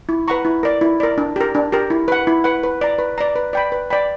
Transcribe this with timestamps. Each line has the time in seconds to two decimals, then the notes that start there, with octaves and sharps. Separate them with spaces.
0.09 E4
0.28 B4 F#5 A#5 C#6
0.45 E4
0.63 A#4 D5
0.81 E4
1.00 A#4 D5
1.18 D4
1.36 G4 A#4
1.55 D4
1.72 G4 A#4
1.90 E4
2.08 B4 F#5
2.27 E4
2.44 B4 F#5
2.63 B4
2.81 D5 A#5
2.99 B4
3.18 D5 A#5
3.36 B4
3.53 D5 G5 B5
3.72 B4
3.90 D5 G5 B5